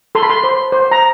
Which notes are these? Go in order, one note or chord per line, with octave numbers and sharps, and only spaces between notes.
A4 C6
B5
C6
C5
C5
A#5